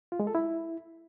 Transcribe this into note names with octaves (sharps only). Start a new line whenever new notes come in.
F4
G#3
A4
E4